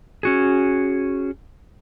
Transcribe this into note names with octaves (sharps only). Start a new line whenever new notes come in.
C#4 F#4 G#4